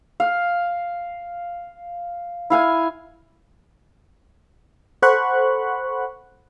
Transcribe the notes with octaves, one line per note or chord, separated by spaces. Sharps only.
F5
E4 F5 G#5
A4 C5 F#5 B5 C#6 F#6